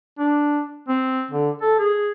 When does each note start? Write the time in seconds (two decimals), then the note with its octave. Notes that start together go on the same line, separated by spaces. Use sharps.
0.19 D4
0.88 C4
1.31 D3
1.62 A4
1.79 G#4